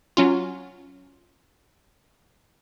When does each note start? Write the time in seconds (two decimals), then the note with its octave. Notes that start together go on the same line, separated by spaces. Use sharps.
0.17 F#3 C#4 F4